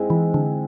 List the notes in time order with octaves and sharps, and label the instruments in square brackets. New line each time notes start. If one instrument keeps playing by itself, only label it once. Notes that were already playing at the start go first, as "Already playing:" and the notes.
Already playing: [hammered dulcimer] G#2 G#3 C4 E4
[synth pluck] E3
D3